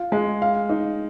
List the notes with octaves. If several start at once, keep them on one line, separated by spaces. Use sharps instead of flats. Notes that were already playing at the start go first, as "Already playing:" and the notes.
Already playing: F4
G#3
F5
D#4